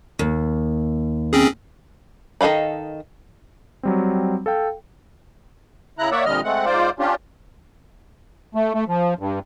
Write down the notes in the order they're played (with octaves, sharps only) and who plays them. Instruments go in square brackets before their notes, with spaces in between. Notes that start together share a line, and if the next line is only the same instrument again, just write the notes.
[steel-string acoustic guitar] D#2
[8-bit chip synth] C4 C#4 G#4
[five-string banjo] D#3 A4 D#5 F5 B5
[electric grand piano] F#3 G3 C4
A4 F5 G5
[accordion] C#3 E4 A#5 F#6
A#3 C#5 D5 E5 F#5
F2 A#2 D3 G3 D#5 F6
G#3 A3 C4 F#5
G#2 F4 C5 D5
C#4 D4 F4 G4
A3
A3
F3
G2